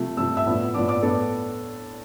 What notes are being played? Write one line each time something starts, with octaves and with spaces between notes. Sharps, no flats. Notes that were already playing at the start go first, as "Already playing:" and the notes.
Already playing: C3 F3 A3
C3 F3 A3 E6
E5 E6
A2 F3 B3 D4
A2 F3 B3 D4 D5 D6
D5 D6
A2 B3 D4 A4